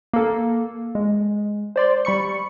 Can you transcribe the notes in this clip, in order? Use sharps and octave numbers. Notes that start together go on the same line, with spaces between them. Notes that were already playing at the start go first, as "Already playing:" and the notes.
A#3 A4
G#3
C5 D5 C6
G3 B5 C#6 C#7